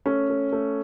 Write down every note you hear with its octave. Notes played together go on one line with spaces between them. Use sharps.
A3 C#4
A3
A3